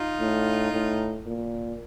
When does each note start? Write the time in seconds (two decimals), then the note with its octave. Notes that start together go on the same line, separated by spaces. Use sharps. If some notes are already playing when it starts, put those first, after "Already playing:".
Already playing: D#4 F4
0.20 A2
0.73 A2
1.26 A#2